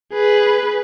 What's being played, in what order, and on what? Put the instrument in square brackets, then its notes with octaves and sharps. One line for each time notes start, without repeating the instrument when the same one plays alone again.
[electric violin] G#4 B4